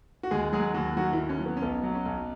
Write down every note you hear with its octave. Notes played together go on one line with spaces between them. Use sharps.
F#4
D#2 G#3 G#4
F#3 G#3 G#4
D#2 F#3 F#4
D#3 F#3 F#4
E3 E4
D#2
C#4
F#3
B3
C#4
B1 B3
F#3
C#4
B1